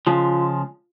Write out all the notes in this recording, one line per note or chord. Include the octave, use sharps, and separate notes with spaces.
C#3 F3 G#3 F4